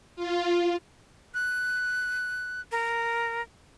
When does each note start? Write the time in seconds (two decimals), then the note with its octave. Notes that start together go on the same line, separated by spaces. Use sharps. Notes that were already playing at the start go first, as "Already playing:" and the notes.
0.16 F4
1.34 F#6
2.72 A#4